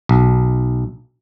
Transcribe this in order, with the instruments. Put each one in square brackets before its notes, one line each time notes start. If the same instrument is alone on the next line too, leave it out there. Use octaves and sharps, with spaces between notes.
[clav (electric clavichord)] B1